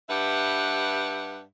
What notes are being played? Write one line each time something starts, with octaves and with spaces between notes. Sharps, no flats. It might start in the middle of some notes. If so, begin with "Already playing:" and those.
G2 G4 B4 E5 F#5